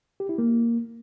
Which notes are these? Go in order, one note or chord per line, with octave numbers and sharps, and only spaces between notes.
G4
E4
A#3